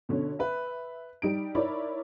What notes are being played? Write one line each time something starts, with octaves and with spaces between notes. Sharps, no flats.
B2 D3 C#4
B4 E5
G3 D#4 D7
D#4 E4 A#4 C#5 D5 B5